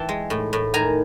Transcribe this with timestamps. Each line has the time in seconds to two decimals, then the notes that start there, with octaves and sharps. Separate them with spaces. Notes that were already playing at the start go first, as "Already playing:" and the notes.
Already playing: E3 G5 A5
0.09 G#3
0.30 A2
0.53 A2
0.74 D#3 G#5 A#5